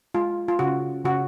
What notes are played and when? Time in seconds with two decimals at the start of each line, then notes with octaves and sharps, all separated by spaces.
0.14 G#3 F4
0.48 F4
0.59 C#3 F#4
1.05 C#3 F#4